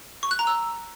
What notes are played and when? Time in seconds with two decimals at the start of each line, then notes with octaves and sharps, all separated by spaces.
0.23 C#6
0.31 F#6
0.39 A#5
0.47 E6